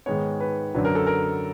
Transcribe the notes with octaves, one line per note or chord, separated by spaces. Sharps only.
G#2 D#3 G#3 B3 C#5
B4
F#2 D3 F#3 B4
A#4
A4
A#4